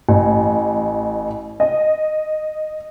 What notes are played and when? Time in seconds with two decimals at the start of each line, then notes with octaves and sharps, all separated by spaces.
0.09 A1
1.60 D#5